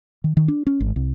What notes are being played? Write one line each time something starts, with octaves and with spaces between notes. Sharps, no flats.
D#3
D#3
D4
C#4
G#1
C2